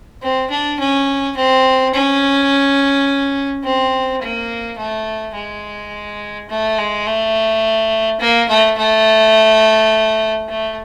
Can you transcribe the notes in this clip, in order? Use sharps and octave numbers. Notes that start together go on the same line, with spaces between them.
C4
D4
C#4
C4
C#4
C4
A#3
A3
G#3
A3
G#3
A3
A#3
A3
A3
A3